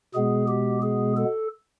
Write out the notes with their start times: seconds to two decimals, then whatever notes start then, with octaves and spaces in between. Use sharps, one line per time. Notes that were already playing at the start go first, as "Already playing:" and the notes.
0.14 B2 G#3 B3 G#4
0.48 G4
0.82 G#4
1.17 A4